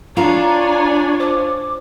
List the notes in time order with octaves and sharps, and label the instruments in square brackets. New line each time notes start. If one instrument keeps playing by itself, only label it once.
[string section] D4 C#5 G#5 [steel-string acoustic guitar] F4 [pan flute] A#5
[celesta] C5 [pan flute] D6